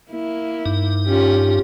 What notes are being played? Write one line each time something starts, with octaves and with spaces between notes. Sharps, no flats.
A#3 E4
G2 D#4
C#4 F4 G4